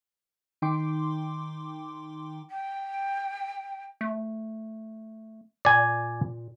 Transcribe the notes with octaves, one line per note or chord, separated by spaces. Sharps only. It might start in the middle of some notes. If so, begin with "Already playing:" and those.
D#3 D#4 G5 C6 D6
G5
A3
A#2 D5 G#5